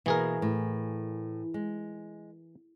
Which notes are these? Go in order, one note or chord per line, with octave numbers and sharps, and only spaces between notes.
B2 E3 A#3 G#4 A#4
A2
G#3